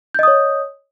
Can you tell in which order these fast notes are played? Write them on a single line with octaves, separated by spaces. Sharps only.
G6 D#5 D#6 C#5